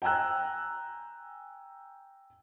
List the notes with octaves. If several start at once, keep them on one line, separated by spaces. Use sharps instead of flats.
G5 G#5 A#5 E6 F#6